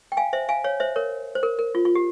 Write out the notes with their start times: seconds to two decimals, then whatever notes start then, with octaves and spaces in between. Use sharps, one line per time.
0.12 G5
0.17 F5 G#5
0.33 C5 E5
0.49 F5 G#5
0.64 C#5 F5
0.80 C5 E5
0.96 A#4 C#5
1.35 C5
1.43 A#4
1.59 A#4
1.75 F4
1.85 F4
1.95 G4